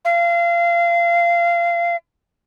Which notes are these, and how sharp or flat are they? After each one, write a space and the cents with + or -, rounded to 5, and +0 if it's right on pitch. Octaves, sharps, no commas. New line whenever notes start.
F5 -25